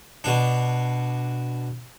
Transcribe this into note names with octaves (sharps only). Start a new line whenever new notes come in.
B2 D4